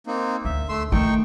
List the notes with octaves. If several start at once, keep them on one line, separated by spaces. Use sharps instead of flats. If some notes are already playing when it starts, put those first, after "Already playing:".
A#3 C4 D#4
D2 E5
A3 C6 E6
D#3 A3 D#4 G5 C#6